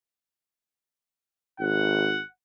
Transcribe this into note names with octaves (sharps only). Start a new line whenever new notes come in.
G#1 F#5